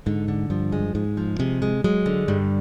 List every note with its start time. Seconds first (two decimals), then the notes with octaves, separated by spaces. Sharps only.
0.06 G#2 D3
0.28 D3
0.50 G2 F3
0.72 G#3
0.95 G#2 G#3
1.17 F3
1.39 C3 G#3
1.62 G#3
1.84 F#3 G#3
2.06 D3
2.28 G2 G3